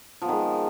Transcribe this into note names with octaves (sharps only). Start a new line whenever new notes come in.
D#3 F3 G#3 B3